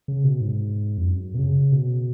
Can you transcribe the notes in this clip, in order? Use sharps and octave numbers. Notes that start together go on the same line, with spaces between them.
C#3
B2
G#2
F2
F#2
B2
C#3
B2